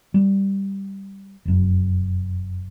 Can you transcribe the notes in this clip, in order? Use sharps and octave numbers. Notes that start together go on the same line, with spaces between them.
G3
F1 F#2